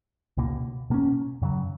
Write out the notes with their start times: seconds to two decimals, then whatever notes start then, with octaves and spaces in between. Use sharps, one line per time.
0.37 C#2 B2 A#3
0.90 B2 A#3 C#4
1.42 F#2 C#3 F#3